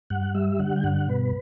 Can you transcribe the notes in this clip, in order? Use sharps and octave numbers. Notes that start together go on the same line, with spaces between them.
G2 F#5
G3 E5
D3 F#5
G5
G2 F#5
B2 B4